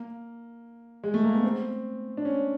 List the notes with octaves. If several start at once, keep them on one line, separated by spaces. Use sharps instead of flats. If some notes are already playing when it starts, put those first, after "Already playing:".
Already playing: A#3
G#3
A3
A#3
B3
C4
D4
C#4